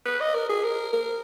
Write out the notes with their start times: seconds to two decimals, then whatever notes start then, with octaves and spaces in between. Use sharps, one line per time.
0.05 B4
0.20 D#5
0.34 A#4
0.49 G#4
0.63 A#4
0.93 A#4